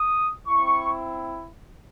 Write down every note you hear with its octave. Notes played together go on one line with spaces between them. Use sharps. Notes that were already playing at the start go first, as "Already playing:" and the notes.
Already playing: D#6
C4 E4 C#6